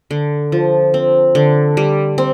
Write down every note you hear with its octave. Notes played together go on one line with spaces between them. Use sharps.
D3
F3
C4
D3
G3
C4